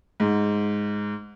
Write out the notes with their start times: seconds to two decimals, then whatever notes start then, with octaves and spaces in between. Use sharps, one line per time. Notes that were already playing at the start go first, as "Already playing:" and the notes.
0.20 G#2